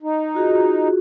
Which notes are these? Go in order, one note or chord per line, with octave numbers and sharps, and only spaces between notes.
D#4
F4 F#4 G#4